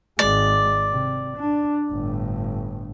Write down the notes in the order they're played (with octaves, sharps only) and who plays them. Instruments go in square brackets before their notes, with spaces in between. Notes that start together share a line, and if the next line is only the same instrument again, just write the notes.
[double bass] G#1 G#3 [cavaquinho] D5
[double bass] C3
D4
G1 A2